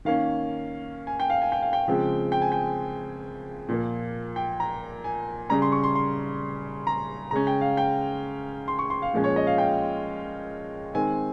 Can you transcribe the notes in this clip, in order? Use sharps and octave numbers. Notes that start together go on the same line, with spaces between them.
D#3 A#3 C#4 F5
G#5
G5
F5
G#5
G5
F5
G5
C#3 F3 G#3 C4
G5
G#5
G5
A#2 F3 A#3
G5
A#5
G#5
C#3 G3 C#4 A#5
C6
C#6
C6
C6
A#5
C#3 G#3 C#4 A#5
G5
F5
G5
C6
C#6
C6
F5
A#2 F3 G#3 C#4
C#5
D#5
F5
G5
D#3 G#3 C4 G#5